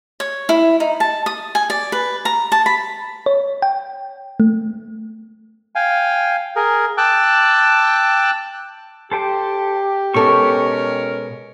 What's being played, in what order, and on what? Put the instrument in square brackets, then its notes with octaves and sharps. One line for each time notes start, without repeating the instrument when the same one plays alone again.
[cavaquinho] C#5
E4
D#4
A5
D#6
G#5
D5
B4
A#5
A5
B5
[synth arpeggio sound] C#5
G5
A3
[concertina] F5 G5 G#5
G#4 A#4
G5 A5 D6 E6 F#6
[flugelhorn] G4 [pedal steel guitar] A4 C5 G5
[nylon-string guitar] B2 A4 [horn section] G#3 C#4 A#4 [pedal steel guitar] C#6